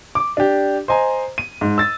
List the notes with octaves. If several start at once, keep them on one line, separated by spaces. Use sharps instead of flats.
D6
D4 G4
C5 D#5 G#5 A#5
D#7
G#2
E6 A6